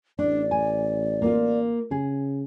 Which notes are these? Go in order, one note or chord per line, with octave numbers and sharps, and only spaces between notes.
A1 D4 D5
G#5
A#3 F4
C#3 G#4